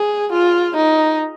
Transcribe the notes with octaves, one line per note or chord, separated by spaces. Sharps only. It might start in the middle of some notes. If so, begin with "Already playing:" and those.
Already playing: G#4
F4
D#4